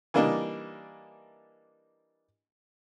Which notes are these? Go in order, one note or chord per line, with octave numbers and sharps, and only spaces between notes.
E3 G3 A#3 D4 D#4